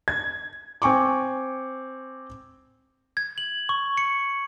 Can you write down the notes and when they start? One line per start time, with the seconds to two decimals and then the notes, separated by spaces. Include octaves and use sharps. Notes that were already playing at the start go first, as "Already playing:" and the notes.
0.08 G#6
0.82 C4 G#5 C#6 D6
3.17 G#6
3.38 F#7
3.69 C#6
3.97 C#7